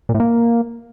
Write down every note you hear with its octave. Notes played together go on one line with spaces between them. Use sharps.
A#2
A2
A#3